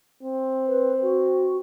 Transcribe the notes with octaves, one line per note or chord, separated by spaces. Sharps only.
C4
B4
F#4